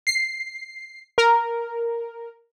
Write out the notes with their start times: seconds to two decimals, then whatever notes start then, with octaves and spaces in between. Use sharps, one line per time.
0.07 C7
1.18 A#4